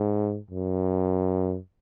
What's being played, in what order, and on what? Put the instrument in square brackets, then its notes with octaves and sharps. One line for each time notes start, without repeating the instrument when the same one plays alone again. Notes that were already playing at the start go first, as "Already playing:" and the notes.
Already playing: [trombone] G#2
F#2